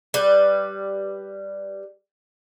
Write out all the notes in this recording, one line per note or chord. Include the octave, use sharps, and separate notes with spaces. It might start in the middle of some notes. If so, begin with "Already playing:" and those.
G3 B4